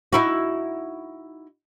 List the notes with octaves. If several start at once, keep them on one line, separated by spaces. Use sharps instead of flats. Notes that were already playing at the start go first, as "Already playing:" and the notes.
D#4 E4 F#4